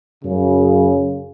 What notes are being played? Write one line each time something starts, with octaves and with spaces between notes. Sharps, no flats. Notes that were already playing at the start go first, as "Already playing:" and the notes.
F#2 C#3